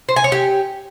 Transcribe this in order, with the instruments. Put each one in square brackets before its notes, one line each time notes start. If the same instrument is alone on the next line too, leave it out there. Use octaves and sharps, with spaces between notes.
[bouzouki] C5
G#5
C#5
G4